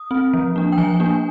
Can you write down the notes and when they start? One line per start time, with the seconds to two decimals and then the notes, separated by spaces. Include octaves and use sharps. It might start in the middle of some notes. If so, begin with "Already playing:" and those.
Already playing: D#6
0.11 C4
0.33 F3
0.56 A#3 D4
0.72 G5
0.78 F3 G#5
1.00 A#3 D4